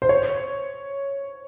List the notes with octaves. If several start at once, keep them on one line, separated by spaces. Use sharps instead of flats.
C5
C#5